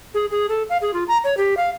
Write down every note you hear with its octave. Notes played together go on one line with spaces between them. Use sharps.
G#4
G#4
A4
F5
G#4
F4
A#5
C#5
G4
F5